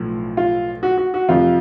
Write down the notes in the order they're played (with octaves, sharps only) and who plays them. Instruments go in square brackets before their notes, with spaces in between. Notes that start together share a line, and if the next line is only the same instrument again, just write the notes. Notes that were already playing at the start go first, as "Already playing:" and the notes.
Already playing: [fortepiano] B1 A2 F3
F4
F#4
F#4
F#4
F2 C3 F3 F4